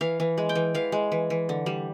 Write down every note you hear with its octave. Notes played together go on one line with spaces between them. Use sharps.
E3 F5
E3
G#3
G5
E3
E3 F5
G#3
E3
E3
D3
G3